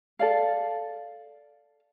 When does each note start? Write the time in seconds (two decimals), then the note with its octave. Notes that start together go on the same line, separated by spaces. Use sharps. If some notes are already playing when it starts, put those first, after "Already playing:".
0.19 A4 D5 F5